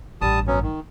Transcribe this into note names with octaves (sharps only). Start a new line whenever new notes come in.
A1 G2 G3 A5 D#6
F#3 B3 C#4
D#3